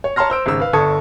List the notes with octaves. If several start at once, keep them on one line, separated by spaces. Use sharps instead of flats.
C#5
C#5 A5 A#5 C6 F6 A#6
C5 E6 D7
G#1 C#3 E6
B4 F5
G1 D3 A4 C#6 D#6 G#6